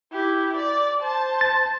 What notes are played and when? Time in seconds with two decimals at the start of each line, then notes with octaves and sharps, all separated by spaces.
0.13 E4 G4
0.56 D5
1.01 C5 A5
1.41 A6